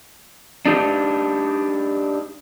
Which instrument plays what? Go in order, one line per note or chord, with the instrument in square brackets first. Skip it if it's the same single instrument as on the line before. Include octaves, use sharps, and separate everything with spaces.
[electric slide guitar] D4 D#4 G4